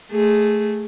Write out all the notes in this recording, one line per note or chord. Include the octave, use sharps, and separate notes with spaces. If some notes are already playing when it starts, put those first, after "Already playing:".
A3 G#4